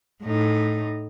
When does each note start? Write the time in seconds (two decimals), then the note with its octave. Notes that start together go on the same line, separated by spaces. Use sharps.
0.23 A2 D#4